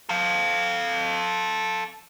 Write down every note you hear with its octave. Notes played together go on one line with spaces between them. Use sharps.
A4 F5